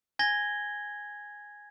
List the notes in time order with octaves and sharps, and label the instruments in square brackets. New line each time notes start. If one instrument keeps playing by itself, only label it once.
[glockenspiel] G#5 G#6 A#6 G7